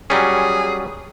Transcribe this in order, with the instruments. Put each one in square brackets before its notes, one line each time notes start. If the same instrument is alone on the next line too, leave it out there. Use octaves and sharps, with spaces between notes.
[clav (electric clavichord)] F#3 G3 C#4 [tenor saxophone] G#4